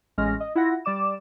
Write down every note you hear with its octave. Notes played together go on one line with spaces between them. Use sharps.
A1 G#3 C#4 F6 A#6
D#5
E4 F4 F#5 A#6
G3 D5 D6 E7